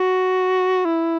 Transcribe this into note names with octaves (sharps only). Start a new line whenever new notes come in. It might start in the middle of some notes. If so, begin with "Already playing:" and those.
Already playing: F#4
E4